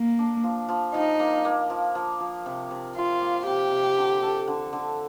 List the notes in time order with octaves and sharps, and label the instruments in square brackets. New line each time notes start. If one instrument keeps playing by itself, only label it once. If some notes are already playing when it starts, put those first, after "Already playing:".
Already playing: [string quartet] A#3
[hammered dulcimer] D4
F3
F3
[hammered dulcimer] F3 [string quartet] D#4
[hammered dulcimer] A#3
A#3
F3
F3
F3
C3
C3
[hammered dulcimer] C3 [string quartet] F4
[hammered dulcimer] A#3
[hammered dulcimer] C3 [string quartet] G4
[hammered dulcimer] C3
D3
A4
D3
D3